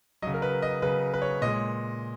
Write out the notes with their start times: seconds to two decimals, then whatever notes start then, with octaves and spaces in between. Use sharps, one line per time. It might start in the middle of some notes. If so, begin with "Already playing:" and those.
0.22 F#3 D#5
0.27 C#3
0.34 A#4
0.42 B4
0.62 D#5
0.82 C#3 F#3 B4
1.14 B4
1.22 C#5
1.42 A#2 G#3 D#5